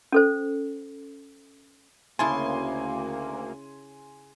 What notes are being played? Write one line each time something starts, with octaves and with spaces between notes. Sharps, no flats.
C#4 A4 C5
D2 C#3 A#3 E4 G#5 A5 C6